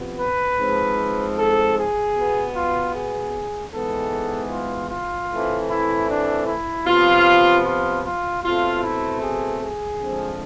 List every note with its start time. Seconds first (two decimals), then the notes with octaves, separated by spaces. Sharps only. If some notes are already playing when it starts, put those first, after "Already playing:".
Already playing: C3 F3 B3
0.20 B4
0.60 G#2 F3 G#3 C4
1.38 A4
1.77 G#4
2.15 B2 B3
2.55 F4
2.94 G#4
3.73 G#2 E3 G#3 B3 A4
4.51 F4
4.90 F4
5.30 A2 E3 A3 C4
5.69 E4
6.08 D4
6.47 E4
6.86 C3 F3 B3 F4
7.64 F4
8.04 F4
8.43 B2 A3 C4 F4
8.82 E4
9.21 G#4
9.61 G#4
9.99 D3 F3 G#3 C4